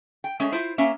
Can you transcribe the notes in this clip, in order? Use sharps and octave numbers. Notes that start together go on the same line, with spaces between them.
G5
G#3 A3 C#4
E4 F4 C5
A#3 C#4 E5